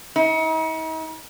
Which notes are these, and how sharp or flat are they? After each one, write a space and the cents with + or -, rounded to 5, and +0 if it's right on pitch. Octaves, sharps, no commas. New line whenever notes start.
D#4 +45